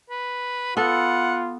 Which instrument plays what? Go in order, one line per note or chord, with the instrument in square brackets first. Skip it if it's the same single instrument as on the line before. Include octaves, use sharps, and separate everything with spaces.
[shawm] B4
[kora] B3 A4 [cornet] F4 [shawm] F#5